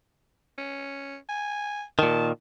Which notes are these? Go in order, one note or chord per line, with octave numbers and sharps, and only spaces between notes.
C#4
G#5
A#2 D#3 A5